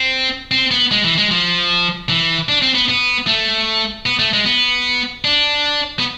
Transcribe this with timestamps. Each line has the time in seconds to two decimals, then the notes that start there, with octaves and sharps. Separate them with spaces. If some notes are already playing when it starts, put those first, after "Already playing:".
Already playing: C4
0.51 C4
0.71 B3
0.91 G#3
1.04 E3
1.18 G#3
1.31 F3
2.09 E3
2.49 D4
2.62 C4
2.75 B3
2.89 B3
3.27 A3
4.06 B3
4.19 A3
4.33 G#3
4.46 B3
5.25 D4
5.99 B3